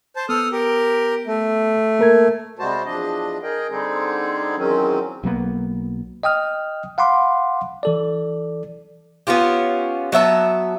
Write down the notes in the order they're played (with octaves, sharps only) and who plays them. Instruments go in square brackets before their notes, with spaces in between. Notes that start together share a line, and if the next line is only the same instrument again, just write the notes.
[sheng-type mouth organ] C5 A5
[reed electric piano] B3 [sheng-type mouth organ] A4 D#6 F6
[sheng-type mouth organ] G4 A#4
A3
[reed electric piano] A#3 A#4 G#6
[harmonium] C3 G3 G#3 F#4 C5 A5
E2 F3 D4 D#5
G#4 A#4 D#5 G5
D3 G3 C4 D#4 G#4
E2 D#3 F#3 G#3 C4 C#4
[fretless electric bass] B1 F#3 A#3 B3
[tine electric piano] D#5 G5 D#6 F6
F5 F#5 B5 C6 D6
E3 A4 D5
[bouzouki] B3 C#4 F4 G4
F#3 B3 E5 A5